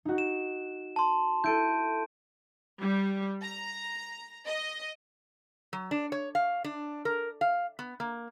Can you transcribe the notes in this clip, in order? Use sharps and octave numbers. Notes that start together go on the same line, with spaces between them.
D#4 F#4
E7
A5 C6
E4 A4 G6 D7 D#7
G3
A#5
D#5
F#3
D4
C#5
F5
D4
A#4
F5
B3
A#3